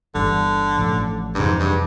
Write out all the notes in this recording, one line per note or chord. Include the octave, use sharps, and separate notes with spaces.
G1 G2 D3 E3
A1 A2 F3
G2
F2 G#2 C3 E3
G2